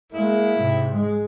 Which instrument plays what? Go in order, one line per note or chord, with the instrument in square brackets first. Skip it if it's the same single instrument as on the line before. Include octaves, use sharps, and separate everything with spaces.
[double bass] G#3 A#3 [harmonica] E4
[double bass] G#2 C3
G#3